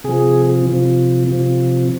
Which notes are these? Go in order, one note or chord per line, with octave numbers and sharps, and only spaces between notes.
C3 F3 G#4
C3 F3
C3 F3